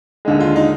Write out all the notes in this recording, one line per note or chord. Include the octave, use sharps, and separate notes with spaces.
D#2 D3 G#3
F4
D#4